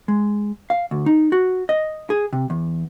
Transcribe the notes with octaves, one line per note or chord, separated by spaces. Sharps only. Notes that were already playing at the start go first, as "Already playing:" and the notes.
G#3
F5
D2
D#4
F#4
D#5
G#4
C3
E2